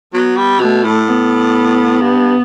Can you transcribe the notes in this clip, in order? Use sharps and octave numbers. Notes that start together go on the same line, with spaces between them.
F#3 B3
G3
B2 A3
A2
B3
G2